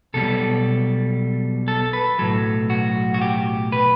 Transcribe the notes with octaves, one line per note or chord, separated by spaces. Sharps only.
B1 B2 G3 A4
A4
B4
B1 A2 F#3 A4
F#4
F#4
G4
B4